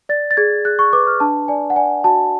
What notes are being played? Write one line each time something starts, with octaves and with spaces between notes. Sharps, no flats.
D5 A6
A6
G#4 G#6
G#4 F#6
C#6
B4 D6
F6
D4 A5
D5 G#5
F#5
D5 G#5
F#4 A5